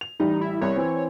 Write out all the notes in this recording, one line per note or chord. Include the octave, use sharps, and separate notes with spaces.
F7
A1 G3 D#4
E4
C2 C#5
E3 C4